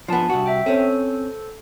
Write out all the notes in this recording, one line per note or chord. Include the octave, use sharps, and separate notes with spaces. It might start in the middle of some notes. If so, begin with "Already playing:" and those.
F3 B3 D4 G#5 A5
C2 F#4
E5 G5
C4 C#4 A4 C5